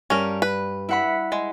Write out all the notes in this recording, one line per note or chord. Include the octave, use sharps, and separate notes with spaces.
G2 C#4 A#4
B4
E4 F#5 B5
G#3